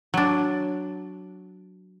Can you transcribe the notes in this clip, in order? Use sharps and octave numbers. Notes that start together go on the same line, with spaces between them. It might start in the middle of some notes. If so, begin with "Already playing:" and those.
F#3 D4